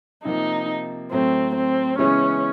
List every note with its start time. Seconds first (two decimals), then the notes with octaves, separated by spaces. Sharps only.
0.25 C3 F3 A#3 D#4
1.12 A2 F#3 A3 C4
1.55 C4
1.98 C#3 E3 G#3 B3 C#4 E4